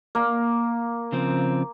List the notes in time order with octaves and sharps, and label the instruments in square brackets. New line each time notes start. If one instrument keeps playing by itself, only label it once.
[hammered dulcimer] A#3
[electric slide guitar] C#3 F3 C4